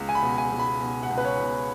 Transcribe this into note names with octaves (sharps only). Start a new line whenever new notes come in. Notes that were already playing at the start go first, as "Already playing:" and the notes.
Already playing: C#2
G#5
B5
B2
G#5
C#2
B5
B2
F#5
C#2
B4
C#5
B2